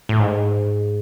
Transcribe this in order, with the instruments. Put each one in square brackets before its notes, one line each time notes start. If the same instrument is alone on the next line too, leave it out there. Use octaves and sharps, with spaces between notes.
[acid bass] A2
G#2